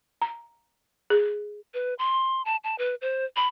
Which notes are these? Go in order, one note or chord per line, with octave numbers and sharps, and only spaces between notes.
A#5
G#4
B4
C6
A5
A5
B4
C5
B5